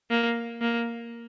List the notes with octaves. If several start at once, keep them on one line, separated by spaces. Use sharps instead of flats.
A#3
A#3